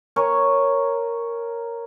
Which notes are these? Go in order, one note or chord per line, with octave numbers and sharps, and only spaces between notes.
A#4 C#5 G#5